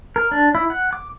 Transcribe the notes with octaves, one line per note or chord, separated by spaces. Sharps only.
A#4
D4
E4
F#5
D6